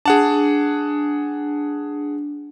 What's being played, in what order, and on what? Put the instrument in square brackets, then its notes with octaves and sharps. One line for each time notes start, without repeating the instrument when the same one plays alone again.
[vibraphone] D4 [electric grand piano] G#4 F#5 A5